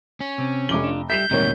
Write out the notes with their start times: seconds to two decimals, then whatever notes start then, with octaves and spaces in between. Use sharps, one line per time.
0.21 C#4
0.38 C3 C4
0.69 F1 F3 G#3 D6 G7
0.84 D4 F4
1.10 G3 G4 E5 G6 B6 C7 E7
1.31 G#1 D2 A#2 G3 A#3 D#4 A#4 C#5